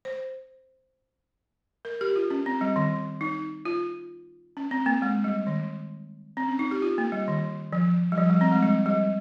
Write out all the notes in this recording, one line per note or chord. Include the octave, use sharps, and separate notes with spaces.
C5
A#4
G4
F4
C#4
C4
G3
D#3
D#4
F4
C#4
C4
A#3
G#3
G3
D#3
C4
C#4
D#4
G4
F4
A#3
G3
D#3
F3
G3
F3
G3
C4
G#3
G3
G3